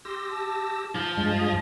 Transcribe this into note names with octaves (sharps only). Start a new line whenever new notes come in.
G4 C6 E6 A#6
A5
F3
G2 G#3 G#6